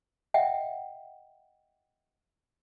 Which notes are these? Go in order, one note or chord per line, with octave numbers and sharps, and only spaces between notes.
D#5 E5 F#5 G5